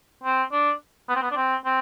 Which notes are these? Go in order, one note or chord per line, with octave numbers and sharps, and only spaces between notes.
C4
D4
B3
C4
B3
D4
C4
C4